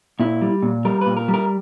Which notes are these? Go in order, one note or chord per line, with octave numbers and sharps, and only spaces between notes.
A#2 E4
G3
A#2
G3 A#4
A#2 B4
A#4
G3
A#4